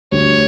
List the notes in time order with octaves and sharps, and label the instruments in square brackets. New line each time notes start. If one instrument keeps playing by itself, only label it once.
[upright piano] D2 D3 G3 [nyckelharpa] C#5